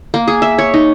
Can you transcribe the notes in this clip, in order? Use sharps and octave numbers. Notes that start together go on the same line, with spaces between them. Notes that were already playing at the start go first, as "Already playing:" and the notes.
A#3
G#4
E5
C#5
D#4